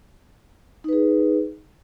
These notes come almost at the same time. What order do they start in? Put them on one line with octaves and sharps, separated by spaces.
D#4 B4 G#4